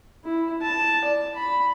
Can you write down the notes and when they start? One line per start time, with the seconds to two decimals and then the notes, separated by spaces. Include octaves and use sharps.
0.25 E4
0.62 A5
1.04 D5
1.35 B5